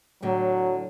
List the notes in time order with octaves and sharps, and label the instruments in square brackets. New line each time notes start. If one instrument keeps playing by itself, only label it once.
[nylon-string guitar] A2 D3 [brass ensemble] F#3